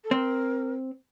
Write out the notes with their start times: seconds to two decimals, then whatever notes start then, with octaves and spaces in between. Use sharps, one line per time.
0.04 A4
0.11 C4 A#4